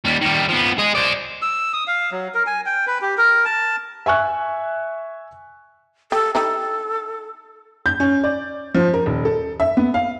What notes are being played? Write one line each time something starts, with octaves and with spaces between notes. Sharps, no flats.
D#2 G3
D#3 G3
F3 B3
G#4 D#5
C5 D5
E6
D#6
F5
F#3
A#4
G#5
G5
B4
G4
A#4
A5
E5 G#5 C#6 F#6
G4 A4
D#4 E4 G4 A4
G6
C#4
D5
F3
A#4
D#1
A4
E5
B3
F5